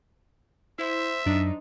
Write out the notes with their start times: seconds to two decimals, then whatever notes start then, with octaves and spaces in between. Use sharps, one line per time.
0.79 E4 C5 E5
1.26 F#2 D4 D#4